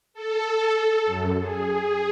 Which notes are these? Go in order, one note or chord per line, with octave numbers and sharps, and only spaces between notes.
A4
F#2
G#4